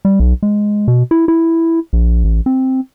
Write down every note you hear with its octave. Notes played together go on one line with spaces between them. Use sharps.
G3
B1
G#3
B2
E4
E4
A#1
A1
C4